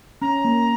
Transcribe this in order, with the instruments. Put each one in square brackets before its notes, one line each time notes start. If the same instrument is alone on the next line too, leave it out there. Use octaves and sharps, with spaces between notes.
[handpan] C#4 [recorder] A#5
[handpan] A#3